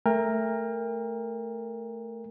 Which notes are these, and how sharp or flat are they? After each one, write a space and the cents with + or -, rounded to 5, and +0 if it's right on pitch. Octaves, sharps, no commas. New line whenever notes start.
A3 +0 A#4 +0 G5 +40